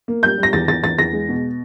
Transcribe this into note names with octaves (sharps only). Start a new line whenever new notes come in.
A#3
G3 G6
G3
A#6
E2 A6
E2 A6
E2 A6
E2 A#6
G#3
B2